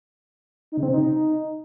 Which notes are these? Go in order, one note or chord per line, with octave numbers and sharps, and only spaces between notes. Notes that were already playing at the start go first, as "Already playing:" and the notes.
D#4
C#3
C4
C3
D#4